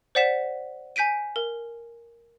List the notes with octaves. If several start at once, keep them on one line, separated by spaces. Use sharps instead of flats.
C5 D5 F#5 B6 E7
G#5 G6 B6 D7 D#7
A#4